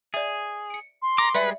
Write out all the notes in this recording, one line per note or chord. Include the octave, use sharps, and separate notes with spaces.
G#4 D5 E5
C#7 D7
C6
A#5 D6
G3 G#3 G#4 B4 D5 E5 C#7